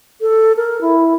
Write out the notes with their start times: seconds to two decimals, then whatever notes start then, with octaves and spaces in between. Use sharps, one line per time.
0.21 A4
0.57 A#4
0.81 E4